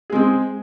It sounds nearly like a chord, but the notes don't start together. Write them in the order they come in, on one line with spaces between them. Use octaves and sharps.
G#4 G#3 C4